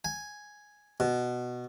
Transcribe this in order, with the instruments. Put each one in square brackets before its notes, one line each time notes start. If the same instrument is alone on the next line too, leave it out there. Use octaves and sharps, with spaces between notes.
[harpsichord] G#5
B2